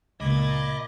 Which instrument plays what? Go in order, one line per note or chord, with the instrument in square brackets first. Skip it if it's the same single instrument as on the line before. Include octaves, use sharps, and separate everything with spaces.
[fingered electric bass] C#2 [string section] A#2 G#6 A6 [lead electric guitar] D#5 [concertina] B5 D6